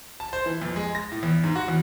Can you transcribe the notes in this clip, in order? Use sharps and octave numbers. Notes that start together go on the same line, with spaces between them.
A5
C5
E3
F2
G#3
A#6
A2
E2
G#2
F#4
E2